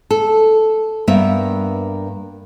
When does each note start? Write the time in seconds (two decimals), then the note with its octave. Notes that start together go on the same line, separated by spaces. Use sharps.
0.11 A4
1.08 G2 A#3 B3 A#4 E5